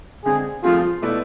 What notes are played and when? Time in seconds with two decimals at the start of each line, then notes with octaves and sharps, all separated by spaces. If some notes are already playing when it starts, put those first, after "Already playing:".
0.25 D3 G#3 C4 G#4
0.63 F3 A3 C4 F4 G#4
1.02 B2 A3 E4 B4 D5